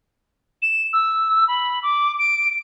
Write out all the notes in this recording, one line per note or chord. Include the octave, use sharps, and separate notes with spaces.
E7
E6
B5
D6
D7